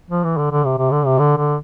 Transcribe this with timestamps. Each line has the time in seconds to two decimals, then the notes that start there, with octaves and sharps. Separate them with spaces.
0.10 F3
0.24 E3
0.38 D3
0.51 D3
0.65 C3
0.78 C3
0.91 D3
1.06 C3
1.19 D3
1.37 D3